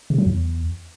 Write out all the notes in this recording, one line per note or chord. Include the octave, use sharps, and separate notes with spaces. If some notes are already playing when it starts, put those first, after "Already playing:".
C3
F#3
E2